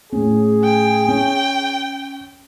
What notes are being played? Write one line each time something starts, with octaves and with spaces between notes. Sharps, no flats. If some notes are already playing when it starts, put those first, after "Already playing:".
A2 C#4 G#4
G5
C#4